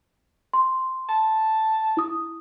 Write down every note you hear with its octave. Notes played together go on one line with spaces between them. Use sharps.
C6
A5
E4 D#6